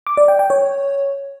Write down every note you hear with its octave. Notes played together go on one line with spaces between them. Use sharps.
D6
D5
G5
G5
C#5